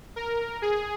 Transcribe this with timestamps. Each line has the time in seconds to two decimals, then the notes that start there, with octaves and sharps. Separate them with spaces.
0.16 A#4
0.62 G#4